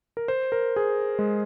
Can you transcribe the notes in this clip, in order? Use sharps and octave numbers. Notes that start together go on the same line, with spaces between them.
A#4
C5
A#4
G#4
G#3